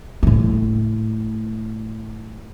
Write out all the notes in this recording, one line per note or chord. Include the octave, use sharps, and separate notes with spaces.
A2 A3